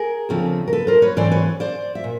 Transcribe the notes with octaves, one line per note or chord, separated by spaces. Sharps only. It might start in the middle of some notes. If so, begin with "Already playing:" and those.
Already playing: G#4 A#4
D2 C#3 F3 A3 C4
A#4
A4 B4
A#4 C5
B4 C#5
G#2 E3 A3 C4 C5 D5
B4 C#5
C5 D5
E5
A#2